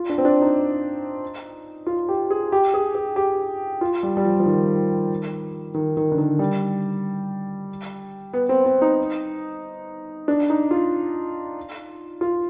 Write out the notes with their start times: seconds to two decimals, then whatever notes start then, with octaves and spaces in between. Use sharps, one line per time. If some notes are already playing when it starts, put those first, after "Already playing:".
Already playing: F4
0.10 D4
0.18 C4
0.25 D4
0.41 D#4
1.87 F4
2.09 G4
2.30 G#4
2.52 G4
2.74 G#4
2.95 G#4
3.16 G4
3.81 F4
4.03 G3
4.17 G3
4.25 F3
4.40 F3
4.46 D#3
5.74 D#3
5.97 D#3
6.12 D3
6.18 D#3
6.39 G3
8.33 B3
8.49 C4
8.66 C4
8.82 D#4
10.28 D4
10.50 D#4
10.71 F4
12.21 F4